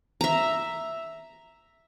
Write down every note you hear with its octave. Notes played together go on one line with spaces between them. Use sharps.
E5 A#5